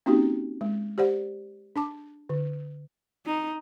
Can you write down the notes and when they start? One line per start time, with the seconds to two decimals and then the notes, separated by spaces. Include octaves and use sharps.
0.06 A#3 C4 C#4 D#4 F#4 G4
0.61 G#3
0.98 G4 C5 D5 F#5
1.76 D4 A5 D6
2.29 D3
3.26 D#4